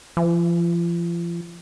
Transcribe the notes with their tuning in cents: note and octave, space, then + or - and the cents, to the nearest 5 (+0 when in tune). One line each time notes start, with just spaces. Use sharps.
F3 -35